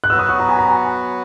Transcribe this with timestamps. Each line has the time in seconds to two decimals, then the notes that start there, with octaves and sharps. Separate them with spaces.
0.04 F#6
0.10 F#3 B3 F#4 B4 E6
0.19 D#6
0.29 C#6
0.40 A#5
0.49 G#5
0.59 A#5
0.68 G#5